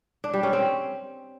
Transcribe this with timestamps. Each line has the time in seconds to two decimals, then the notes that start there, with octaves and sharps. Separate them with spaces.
0.24 D4
0.34 G3
0.43 C#4
0.53 C4